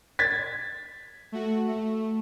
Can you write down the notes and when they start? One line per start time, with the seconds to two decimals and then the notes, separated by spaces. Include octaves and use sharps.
0.19 G#6 A6 B6
1.32 A3 F#4
1.68 A3